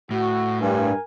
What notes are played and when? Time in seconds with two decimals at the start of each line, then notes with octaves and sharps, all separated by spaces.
0.11 A2 F#4
0.61 G2 A#4 G#5